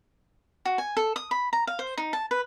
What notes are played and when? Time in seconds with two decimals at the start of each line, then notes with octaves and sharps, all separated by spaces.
0.65 F#4
0.78 G#5
0.97 A4
1.16 D#6
1.31 B5
1.53 A#5
1.67 F5
1.79 C5
1.98 D#4
2.13 A5
2.31 B4